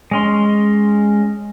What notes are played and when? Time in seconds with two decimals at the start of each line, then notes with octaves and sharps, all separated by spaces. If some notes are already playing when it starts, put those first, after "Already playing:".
0.11 G#3 C#4 C6